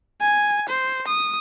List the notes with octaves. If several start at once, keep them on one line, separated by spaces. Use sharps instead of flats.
G#5
C5
D#6